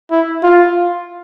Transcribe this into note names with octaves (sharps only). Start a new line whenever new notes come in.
E4
F4